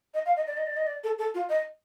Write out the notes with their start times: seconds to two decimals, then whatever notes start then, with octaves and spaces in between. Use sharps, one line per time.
0.14 D#5
0.26 F5
0.36 D#5
0.47 D5
0.57 D#5
0.67 D5
0.77 D#5
0.87 D5
1.04 A4
1.18 A4
1.34 F4
1.49 D#5